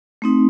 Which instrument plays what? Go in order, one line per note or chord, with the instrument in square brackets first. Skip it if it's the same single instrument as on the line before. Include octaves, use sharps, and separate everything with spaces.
[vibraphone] A3 C4 D#4